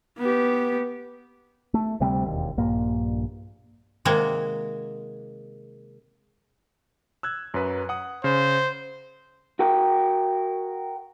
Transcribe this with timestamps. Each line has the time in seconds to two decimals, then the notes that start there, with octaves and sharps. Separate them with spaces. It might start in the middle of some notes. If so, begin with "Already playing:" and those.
0.18 B3 G4
1.74 A3
2.00 D2 C3 G3 C4
2.24 E1 D#2
2.57 A#1 G2 A#3
4.05 C3 D#3 G#3 A#3 F#4
7.23 E6 F#6 G#6
7.54 F#2 F#3 B4
7.89 F#5 D#6
8.24 C#3 C5
9.59 F#4 A#4 G5